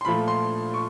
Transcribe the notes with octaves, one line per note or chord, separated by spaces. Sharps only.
C6
A#2 F3 A3 B5
C6
C#6